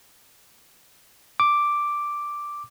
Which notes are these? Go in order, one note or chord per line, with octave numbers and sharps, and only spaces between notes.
D6